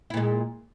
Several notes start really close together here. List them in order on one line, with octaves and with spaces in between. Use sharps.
E4 A#2 G#3